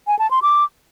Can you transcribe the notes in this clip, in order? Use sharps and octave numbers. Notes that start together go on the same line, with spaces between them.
G#5
A5
C6
D6